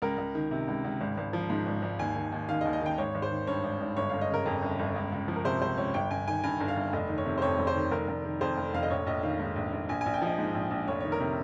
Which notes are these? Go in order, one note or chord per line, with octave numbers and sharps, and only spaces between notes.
C#2 A#4
C#2
D#3
C3
C#2
C#2
G#1
G#1
F3
G#2
G#1
G#1
D#2 G#5
D#3
D#2
D#3 F5
D#5
D#2
D#5
D#3 G5
G#1 C#5
G#1
C5
D#3
G2 C#5
G#1
G#1
G1 C#5
G1 F5
D#5
C#3 A#4
F2
G1
G1
C#2
C#2
F3
A#4
C3 C5
C#2 C5
C#2 C#5
G1 G5
G1 G#5
D#3 G#5
G2 G#5
G1
F5
G1
F1 D#5
D#3
C#5
C3
C5
F2 C#5
F1
C5
D#3
F1 A#4
F1
D#3
F2 C5
F1
F1 F5
D#5
A#1 C#5
A#1 D#5
D#3 F5
G#2
A#1
A#1
A#1 G#5
A#1 G#5
G5
F3 D#5
G#2
A#1
A#1
F1 C#5
D#3 C#5
A#4
C3